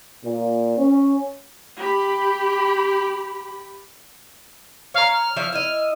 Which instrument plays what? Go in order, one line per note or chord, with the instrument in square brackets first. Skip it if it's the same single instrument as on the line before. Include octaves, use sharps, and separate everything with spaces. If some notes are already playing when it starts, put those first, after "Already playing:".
[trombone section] A#2
C#4
[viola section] G4 B5
[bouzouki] C#5 A#5 [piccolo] F5
[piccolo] F6
[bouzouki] F3 C#5 E5
[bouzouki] E4 D#5 [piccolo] F6